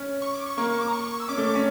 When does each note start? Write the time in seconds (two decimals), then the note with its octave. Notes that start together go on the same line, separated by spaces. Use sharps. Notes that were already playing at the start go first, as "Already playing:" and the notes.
Already playing: C#4
0.22 C#6
0.34 D6
0.46 C#6
0.57 A#3 C#6
0.69 C#6
0.81 D6
0.88 A#5
0.93 C#6
1.20 E6
1.28 C#4 D6
1.37 A3
1.45 D6
1.55 C#4